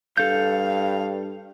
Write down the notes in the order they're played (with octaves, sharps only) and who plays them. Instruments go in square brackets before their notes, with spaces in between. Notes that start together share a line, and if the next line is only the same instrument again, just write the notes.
[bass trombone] G2 [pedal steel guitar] A4 G6 [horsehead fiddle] F5